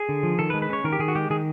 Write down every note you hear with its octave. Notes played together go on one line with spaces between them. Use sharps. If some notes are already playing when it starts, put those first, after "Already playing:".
Already playing: G#4
D3
F3
D#3 A4
B4
G#3
B4
C#4 C#5
D#3 A#4
G4
D#3 G#4
F#4
G#3 G4
D#3 G#4